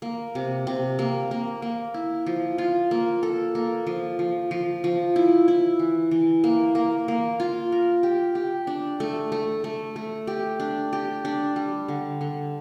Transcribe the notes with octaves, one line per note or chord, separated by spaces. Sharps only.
A#3
C3
C3
A#3
A#3
A#3
E4
F3
F4
A#3
A4
A#3
F3
F3
F3
F3
E4
E4
E3
E3
A#3
A#3
A#3
F4
A#4
G4
G4
D4
A3
A3
A3
A3
G4
D4
G4
D4
G3
D3
D3